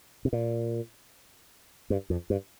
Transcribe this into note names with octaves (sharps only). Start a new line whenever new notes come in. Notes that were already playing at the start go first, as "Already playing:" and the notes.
C3
A#2
G2
F2
G2